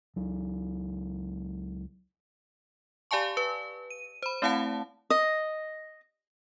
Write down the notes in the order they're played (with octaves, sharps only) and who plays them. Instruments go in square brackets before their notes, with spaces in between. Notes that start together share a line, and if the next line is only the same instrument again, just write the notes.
[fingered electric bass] C#2 F#3
[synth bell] G4 D5 F5 G#5 A5 C#6
B4
D#7
C5 B5
A3 C4 E4 F5 F#5 A5
[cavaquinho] D#5